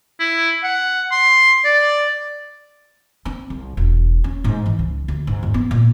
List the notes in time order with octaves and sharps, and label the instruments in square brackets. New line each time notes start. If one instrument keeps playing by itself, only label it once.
[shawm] E4
F#5
C6
D5
[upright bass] C4
C2
E1
C#4
G#2
E3
C#2
D2
G#2
E2
B3
A#2